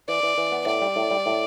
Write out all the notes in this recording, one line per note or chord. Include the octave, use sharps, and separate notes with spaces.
E3 D5
E3
E3
B3
A2 D5
G3
A2
G3
A2